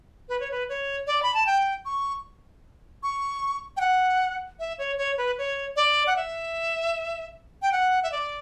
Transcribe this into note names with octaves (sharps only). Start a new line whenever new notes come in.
B4
C#5
B4
C#5
D5
B5
A5
G5
C#6
C#6
G5
F#5
E5
C#5
C#5
B4
C#5
D5
F#5
E5
G5
F#5
E5
D5